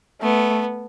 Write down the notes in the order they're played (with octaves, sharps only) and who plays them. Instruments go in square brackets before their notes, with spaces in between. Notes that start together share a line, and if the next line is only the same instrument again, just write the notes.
[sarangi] A3 [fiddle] B3